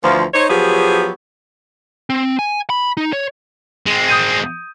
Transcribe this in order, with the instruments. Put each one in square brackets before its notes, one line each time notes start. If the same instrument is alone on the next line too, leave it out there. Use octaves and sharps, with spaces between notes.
[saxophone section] D2 E3 F3
D#4 C5 C#5
F3 F#3 B3 G4 G#4
[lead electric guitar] C4
G#5
B5
D#4
C#5
[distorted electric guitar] G#3 C4
[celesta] D#6 G6 D#7